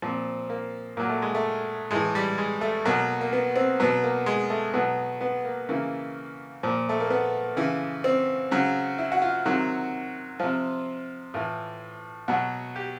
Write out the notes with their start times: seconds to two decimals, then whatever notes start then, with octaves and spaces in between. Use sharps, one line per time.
0.02 A#2 F3 C4
0.50 A#3
0.97 A#2 F#3 A#3
1.09 A3
1.22 G#3
1.35 A3
1.91 A2 E3 G#3
2.15 G3
2.38 G#3
2.61 A3
2.85 B2 F#3 A#3
3.21 A#3
3.33 B3
3.56 C4
3.80 B2 F#3 B3
4.03 A#3
4.26 G#3
4.50 A3
4.74 B2 F#3 B3
5.21 B3
5.45 A#3
5.69 C#3 E3 A#3
6.63 A#2 F3
6.89 A3
7.00 A#3
7.10 B3
7.57 C#3 E3
8.04 C4
8.51 C#3 F#3
8.98 E4
9.12 F#4
9.22 F4
9.45 C3 D#3 F#3 F#4
10.39 C3 F3 F4
11.34 A2 E3 F4
12.28 B2 F#3 F#4
12.76 G4